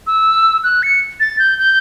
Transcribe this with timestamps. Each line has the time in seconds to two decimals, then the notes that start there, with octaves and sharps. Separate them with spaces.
0.07 E6
0.64 F#6
0.83 C#7
1.20 A6
1.39 G6
1.58 G6